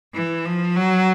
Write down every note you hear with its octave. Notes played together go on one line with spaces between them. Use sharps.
E3
F3
F#3